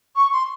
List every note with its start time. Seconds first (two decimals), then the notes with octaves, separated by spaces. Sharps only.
0.16 C#6
0.32 C6